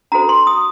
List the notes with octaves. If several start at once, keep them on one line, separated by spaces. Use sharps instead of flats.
D4 F#4 A4 C5 A#5
C6
D#6